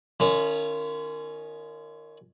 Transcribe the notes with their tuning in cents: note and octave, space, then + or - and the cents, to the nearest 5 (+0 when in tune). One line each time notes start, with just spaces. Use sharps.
D#3 -15 C#4 +20 F4 -35